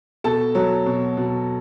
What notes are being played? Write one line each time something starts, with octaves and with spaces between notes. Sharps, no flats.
B2 A4 A5
F#3
B2
B2